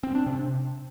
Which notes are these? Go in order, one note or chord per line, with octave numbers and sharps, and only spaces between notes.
C4
D4
C3